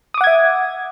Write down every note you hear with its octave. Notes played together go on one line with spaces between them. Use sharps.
E5 F#5 D6 D#6 G#6